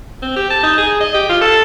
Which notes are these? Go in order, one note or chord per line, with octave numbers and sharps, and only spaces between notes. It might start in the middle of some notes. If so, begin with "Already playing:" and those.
C4
G4
A5
D#4
G#4
D#5
G4
F4
A4